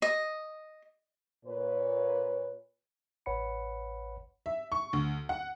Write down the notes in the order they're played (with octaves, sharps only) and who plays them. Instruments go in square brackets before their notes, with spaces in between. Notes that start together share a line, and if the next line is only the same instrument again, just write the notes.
[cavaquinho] D#5
[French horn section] A#2 B4 C#5
[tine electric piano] A1 B4 C#5 F#5 B5 C#7
[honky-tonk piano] E5
C#6
D2
F#5